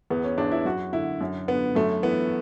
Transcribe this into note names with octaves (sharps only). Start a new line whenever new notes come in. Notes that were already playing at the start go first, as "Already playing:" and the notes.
E2 B3
C#4
E2 D4
E4
F#2 F#4
D3 E4
F#2
D3 B3
F#2 A3
E3 B3